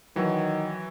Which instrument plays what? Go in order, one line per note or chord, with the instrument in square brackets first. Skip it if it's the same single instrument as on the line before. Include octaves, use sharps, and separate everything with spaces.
[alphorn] D#3 [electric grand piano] E3 F#3